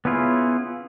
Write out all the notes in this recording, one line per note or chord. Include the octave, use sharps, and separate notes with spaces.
B3 C#4 E4 F4 G#4